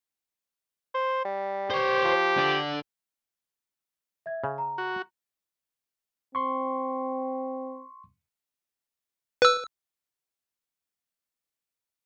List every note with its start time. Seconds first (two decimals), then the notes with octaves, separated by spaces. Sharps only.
0.94 C5
1.25 G3
1.70 G4 C5 C#5
2.04 F3
2.37 D3 D5
4.26 E5 G#6
4.44 C#3
4.58 A#5
4.78 F#4
6.35 C4 C6 C#6
9.42 B4 E6